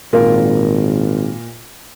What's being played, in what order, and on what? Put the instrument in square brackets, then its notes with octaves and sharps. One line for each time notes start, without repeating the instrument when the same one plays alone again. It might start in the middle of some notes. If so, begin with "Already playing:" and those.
[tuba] G#1 [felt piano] A#2 F4 A#4